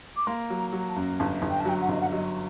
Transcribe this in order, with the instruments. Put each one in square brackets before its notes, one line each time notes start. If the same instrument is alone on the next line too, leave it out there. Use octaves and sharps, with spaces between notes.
[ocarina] D6
[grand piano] A#3 [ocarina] C6
[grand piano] F#3
[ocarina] A#5
[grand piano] F#3
[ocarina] A5
[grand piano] F#2
[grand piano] G1 [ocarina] A5
[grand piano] G1
[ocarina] G5
A5
[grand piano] F#3 [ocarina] G5
[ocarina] F#5
[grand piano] G1 [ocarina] D#5
[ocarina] F#5
[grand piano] F#3 [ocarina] D#5